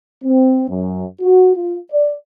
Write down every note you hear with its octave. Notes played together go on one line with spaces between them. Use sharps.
C4
F#2
F#4
F4
D5